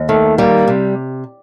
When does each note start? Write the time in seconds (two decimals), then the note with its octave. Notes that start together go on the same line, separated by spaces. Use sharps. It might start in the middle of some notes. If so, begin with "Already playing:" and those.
Already playing: D#2
0.09 D#3 A3
0.38 G3 A#3
0.68 C3